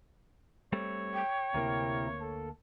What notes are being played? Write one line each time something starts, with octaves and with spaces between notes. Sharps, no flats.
G3 A3 C4 C#5
G5
D2 C3 A#3 E4 A#4
A4